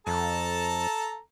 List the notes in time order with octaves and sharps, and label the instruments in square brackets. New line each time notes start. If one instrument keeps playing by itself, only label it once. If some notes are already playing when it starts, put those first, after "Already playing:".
[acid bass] F2 [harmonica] A4 A5 A#5